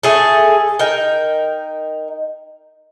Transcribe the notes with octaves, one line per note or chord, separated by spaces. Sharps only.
A3 G#4 A4
D#4 A#4 G5